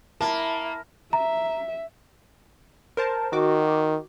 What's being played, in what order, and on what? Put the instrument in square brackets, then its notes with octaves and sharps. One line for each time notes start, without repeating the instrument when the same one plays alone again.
[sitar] A#3 [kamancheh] E4 [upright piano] A5
[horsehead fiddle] E5 [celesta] A#5
[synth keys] A#4 C5 A5
[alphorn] D#3 [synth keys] F#4 D6